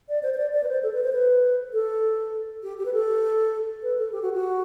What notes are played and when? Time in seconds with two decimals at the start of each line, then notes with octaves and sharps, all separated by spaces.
0.09 D5
0.23 C5
0.34 C5
0.38 D5
0.53 D5
0.64 B4
0.68 C5
0.83 A4
0.93 B4
1.03 C5
1.13 B4
1.73 A4
2.63 G4
2.78 G4
2.85 B4
2.93 A4
3.83 B4
3.98 A4
4.12 G4
4.22 F#4
4.33 F#4